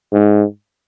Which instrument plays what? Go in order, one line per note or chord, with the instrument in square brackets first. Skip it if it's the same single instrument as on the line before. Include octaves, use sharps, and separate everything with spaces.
[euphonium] G#2